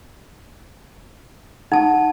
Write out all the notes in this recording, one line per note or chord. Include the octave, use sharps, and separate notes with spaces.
D#4 F#5 A5